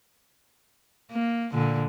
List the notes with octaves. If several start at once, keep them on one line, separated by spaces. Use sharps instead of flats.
A#3
A#2 D3